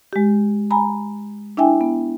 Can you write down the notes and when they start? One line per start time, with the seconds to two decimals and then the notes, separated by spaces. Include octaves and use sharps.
0.13 G#3 G4
0.71 G#5 A#5 B5
1.57 D4 E4 E5 G5 G#5
1.81 B3